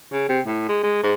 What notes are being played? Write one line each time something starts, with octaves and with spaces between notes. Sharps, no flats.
C#3
C3
A2
G#3
G#3
G#2